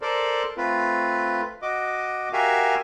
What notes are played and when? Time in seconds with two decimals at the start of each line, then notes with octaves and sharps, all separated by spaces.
0.01 A4 A#4 C5 D5
0.57 A3 C4 F4 B4
1.62 F#4 D#5 D6
2.33 F#4 G4 A#4 E5 F5 G#5